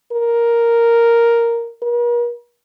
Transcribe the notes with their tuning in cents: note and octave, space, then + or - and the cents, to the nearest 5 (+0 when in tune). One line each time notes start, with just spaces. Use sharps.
A#4 +0
A#4 +45